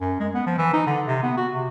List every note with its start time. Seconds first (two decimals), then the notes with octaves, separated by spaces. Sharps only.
0.01 F#2
0.19 G#3
0.34 B3
0.46 F3
0.58 E3
0.73 D#4
0.87 D3
1.07 C3
1.23 B3
1.37 F#4
1.53 C3